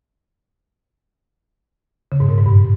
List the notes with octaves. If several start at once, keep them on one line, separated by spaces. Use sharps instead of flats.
C#3
G#2
A#2
G#2
G2